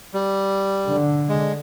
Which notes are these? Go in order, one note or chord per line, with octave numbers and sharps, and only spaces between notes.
G3
D3
G#3